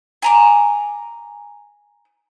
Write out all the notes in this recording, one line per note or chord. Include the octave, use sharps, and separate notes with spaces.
G#5 A#5 D6